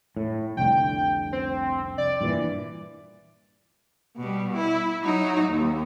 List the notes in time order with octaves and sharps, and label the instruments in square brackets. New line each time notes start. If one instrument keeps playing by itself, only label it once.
[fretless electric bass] A2
[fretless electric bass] F1 C2 D3 [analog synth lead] G5
[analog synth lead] C4
D5
[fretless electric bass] G2 A#2 E3
[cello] B2 G3
E4
F#3 D#4
D#2